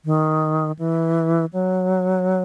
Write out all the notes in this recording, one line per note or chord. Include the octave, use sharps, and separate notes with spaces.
D#3
E3
F#3